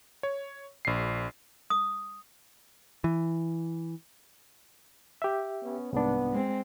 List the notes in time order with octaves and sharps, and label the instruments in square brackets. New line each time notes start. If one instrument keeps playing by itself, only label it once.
[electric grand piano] C#5
A#1 C7
[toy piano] D#6
[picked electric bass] E3
[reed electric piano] G4 E5
[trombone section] B3 C#4
[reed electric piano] C2 G#2 D4 [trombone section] B3
[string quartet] G#3 C4